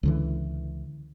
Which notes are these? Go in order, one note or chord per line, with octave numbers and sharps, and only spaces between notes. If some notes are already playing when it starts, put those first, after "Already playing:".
C#2 D3 E3